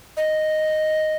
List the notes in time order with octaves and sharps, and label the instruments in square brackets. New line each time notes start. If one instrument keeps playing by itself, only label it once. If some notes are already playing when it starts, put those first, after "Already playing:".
[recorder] D#5